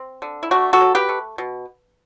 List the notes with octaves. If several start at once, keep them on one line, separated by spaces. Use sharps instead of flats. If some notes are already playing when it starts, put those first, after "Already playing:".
Already playing: C4
D3
E4
A3 D4 F#4
F#4 A4
F#3
G4 B4
A3
B2